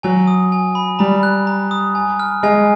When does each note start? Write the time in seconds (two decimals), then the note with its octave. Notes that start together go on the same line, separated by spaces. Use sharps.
0.03 F#3 G#5
0.27 D#6
0.52 G#5
0.75 B5
0.99 G3 A#5
1.23 F#6
1.47 A#5
1.71 D#6
1.95 G#5
2.20 F6
2.43 G#3 G#5